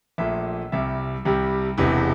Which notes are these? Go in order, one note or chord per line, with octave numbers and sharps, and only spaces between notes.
A#1 A#2 A3 E5
C2 C3 G3 E5
C2 C3 G3
E1 E2 C3 E3